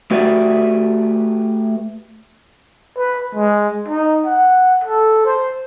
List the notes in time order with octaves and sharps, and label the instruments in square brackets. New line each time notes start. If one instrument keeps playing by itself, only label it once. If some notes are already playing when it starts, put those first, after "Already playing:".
[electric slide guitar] A3 F#4 G4 B4 D5 E5
[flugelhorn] B4
G#3
D#4
F#5
A4
C5